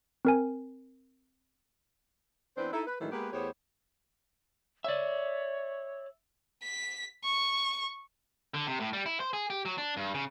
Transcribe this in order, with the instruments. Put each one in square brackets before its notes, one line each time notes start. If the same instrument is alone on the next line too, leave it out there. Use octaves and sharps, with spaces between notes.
[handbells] C4 A#4 G#5
[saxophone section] E3 B3 C4 D4 B4 C5
D#4 E4 A4
B4
A2 D#3 E3 F#3 G#3 D4
G#3 A#3 B3 G4 B4
E2 A3 B3 G4 C5 C#5
[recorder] C#5 [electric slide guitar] D5 E5
[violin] B6
C#6
[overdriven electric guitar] D3
C3
A2
G3
E4
C5
G#4
G4
F#3
D4
G2
C#3